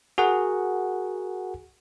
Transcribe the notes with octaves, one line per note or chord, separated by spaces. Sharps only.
F#4 G#4 A#4 F#5